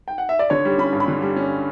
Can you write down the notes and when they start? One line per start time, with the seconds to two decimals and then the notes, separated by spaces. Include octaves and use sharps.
0.08 G5
0.18 F#5
0.29 E5
0.39 D5
0.50 D3 C#5
0.65 G3
0.78 C#4 B5
0.93 G2
1.00 B5
1.08 D3
1.22 G3
1.36 C#4